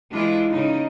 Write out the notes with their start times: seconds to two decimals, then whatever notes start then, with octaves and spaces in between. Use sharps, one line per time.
0.13 E3 G#3 D4 E4 F4
0.50 C#3 D#4